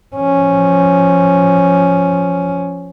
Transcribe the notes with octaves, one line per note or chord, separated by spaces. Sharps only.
F3 C#4